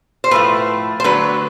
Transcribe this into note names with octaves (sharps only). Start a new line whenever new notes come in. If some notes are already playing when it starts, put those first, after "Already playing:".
C5
A2 F3 A3 B4
C5
D3 F#3 A3 B4